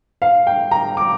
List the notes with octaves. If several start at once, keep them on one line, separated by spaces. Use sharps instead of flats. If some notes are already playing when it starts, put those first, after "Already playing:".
F5
G5
A#5
D6